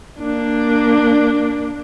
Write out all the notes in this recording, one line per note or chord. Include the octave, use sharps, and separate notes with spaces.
A#3 D4